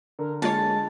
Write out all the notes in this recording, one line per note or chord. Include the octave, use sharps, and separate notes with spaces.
D3 A#4
G#3 A#3 F4 C#5 A5